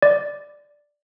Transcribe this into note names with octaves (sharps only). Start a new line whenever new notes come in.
D5